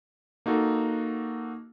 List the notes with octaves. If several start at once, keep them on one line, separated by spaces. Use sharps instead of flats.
A#3 D#4 F#4 A4